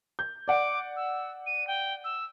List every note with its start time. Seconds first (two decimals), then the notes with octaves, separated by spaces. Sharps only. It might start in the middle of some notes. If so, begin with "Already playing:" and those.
0.19 G6
0.48 D5 F#5 D6
0.96 E6
1.46 D#7
1.67 G5
2.04 E6